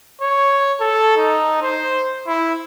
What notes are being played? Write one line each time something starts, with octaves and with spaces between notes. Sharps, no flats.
C#5
A4
D#4
C5
E4